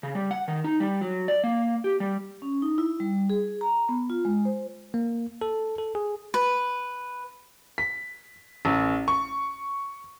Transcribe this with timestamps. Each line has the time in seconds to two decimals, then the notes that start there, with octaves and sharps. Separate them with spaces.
0.03 C#3
0.15 G3
0.31 F#5
0.48 D#3
0.64 D#4
0.80 G3
1.01 F#3
1.28 D5
1.44 A#3
1.84 G4
2.00 G3
2.42 C#4
2.62 D#4
2.78 E4
3.00 G3
3.30 G#4
3.61 A#5
3.89 B3
4.10 F4
4.25 G#3
4.45 C5
4.94 A#3
5.41 A4
5.78 A4
5.95 G#4
6.34 B4
7.78 B6
8.65 A1
9.08 C#6